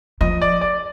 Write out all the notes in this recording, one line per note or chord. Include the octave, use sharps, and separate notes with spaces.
F3 D#5
D5
D5